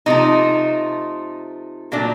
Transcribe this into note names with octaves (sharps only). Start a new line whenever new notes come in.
C3 F3 A3 D#4
A#2 F#3 A3 D4